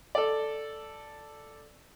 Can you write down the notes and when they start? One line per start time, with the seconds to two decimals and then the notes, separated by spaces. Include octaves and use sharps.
0.15 A4 D5